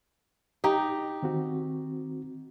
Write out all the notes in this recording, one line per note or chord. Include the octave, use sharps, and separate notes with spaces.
D#4 G4
D#3 C4 F#4